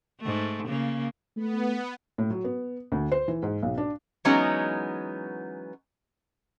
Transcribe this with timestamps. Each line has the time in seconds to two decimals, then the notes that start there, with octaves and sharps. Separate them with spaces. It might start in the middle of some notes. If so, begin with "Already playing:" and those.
0.21 G#2 A3
0.68 C#3 A#3
1.37 A3 B3
2.18 A2
2.30 F#3
2.44 B3
2.92 D2
3.12 C5
3.28 E3
3.43 G#2
3.63 B1
3.78 D4
4.25 E3 F#3 G#3 B3 C#4 D#4